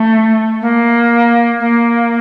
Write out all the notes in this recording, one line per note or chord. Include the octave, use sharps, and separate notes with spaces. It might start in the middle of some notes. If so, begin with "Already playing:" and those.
Already playing: A3
A#3
A#3